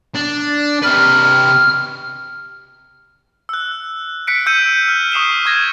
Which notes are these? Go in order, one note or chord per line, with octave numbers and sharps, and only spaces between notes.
D4
C3 B4 F6
E6 F#6
F#6 B6 C#7 D7
E6 G6 C#7 D#7
F6
C#6 D#6 C7 E7 G7
C#6 G#6 A#6